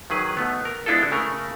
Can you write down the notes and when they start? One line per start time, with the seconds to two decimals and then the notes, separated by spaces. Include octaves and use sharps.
0.10 D#3 F#3 G#4 B4
0.37 B2 A3 B3
0.65 A#4
0.86 G#3 B3 D4 E4 F4 A4
1.12 C#3 A3 A#4